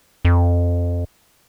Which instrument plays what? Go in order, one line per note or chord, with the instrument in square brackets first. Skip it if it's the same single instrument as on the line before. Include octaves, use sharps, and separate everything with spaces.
[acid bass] F2